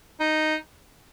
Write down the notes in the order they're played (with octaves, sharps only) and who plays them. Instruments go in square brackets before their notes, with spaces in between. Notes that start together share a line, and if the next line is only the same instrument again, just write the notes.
[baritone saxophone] D#4